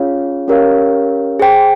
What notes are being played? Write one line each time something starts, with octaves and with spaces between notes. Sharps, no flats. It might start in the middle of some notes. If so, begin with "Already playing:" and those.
Already playing: C#4 F4 G#4 C#5 F5
C#4 G4 A#4 C#5 F5
G#4 C5 G5